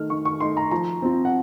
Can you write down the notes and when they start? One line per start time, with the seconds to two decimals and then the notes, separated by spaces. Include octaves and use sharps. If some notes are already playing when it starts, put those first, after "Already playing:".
Already playing: D#3 A3 D#4 F6
0.10 D#3 C#6
0.25 C#6
0.40 A3 D#4 C6
0.57 A#5
0.71 F3 A#5
1.02 C4 F4
1.25 F#5